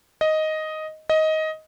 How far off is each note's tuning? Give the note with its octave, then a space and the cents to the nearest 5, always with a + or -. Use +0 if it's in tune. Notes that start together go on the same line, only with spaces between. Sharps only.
D#5 +5
D#5 +15